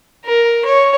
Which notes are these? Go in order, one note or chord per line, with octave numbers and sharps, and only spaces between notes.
A#4
C#5